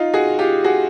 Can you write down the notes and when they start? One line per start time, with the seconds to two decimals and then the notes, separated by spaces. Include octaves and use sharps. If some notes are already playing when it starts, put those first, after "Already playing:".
Already playing: D#4 F4
0.14 F#4 G#4
0.39 F4 G4
0.64 F#4 G#4